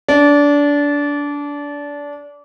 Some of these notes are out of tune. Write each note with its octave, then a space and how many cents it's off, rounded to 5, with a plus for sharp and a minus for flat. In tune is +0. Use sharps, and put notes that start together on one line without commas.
D4 -25